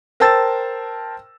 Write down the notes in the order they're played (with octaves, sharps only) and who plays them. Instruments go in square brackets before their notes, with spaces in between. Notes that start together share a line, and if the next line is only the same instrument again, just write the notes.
[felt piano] A#4 C5 G5 A5 E6 A6